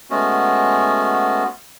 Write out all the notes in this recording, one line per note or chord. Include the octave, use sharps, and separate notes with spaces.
G#3 A3 B3 C#4 F#4